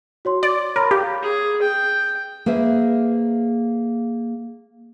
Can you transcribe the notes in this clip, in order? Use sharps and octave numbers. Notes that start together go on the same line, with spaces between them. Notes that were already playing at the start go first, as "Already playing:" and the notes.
F#4 C#5 C6
D5 C6
A#4 C#5 B5 C6
G4 F5
G#4
G5
A#3 G#4 B4 C5 E5